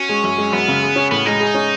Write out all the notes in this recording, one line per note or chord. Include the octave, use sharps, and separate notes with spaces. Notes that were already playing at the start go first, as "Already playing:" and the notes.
Already playing: C#4 F#4
G#3
F#2
G#3
F#2 B3
C#3
G#4
C#4
A2 B3
G#3 D#4
G#4
C#4